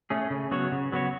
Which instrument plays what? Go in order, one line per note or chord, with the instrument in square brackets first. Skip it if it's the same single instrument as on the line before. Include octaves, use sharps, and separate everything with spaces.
[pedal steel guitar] A3 C#4 G#4
C#3
F#3 B3 F#4 C#5
C#3
F#3 B3 F#4 C#5